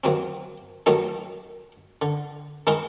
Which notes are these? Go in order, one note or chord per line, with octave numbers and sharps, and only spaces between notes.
D#2 F#3 C4
D#2 D#3 F#3 A3 D#4
D3
D#3 G#3 D#4 E4 A#4 C#6